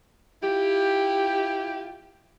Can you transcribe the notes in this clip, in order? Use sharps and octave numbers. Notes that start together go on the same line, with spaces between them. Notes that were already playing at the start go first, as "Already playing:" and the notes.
E4 F4 G4